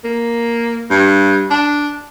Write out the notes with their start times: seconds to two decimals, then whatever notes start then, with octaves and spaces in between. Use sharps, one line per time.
0.04 A#3
0.91 G2
1.51 D4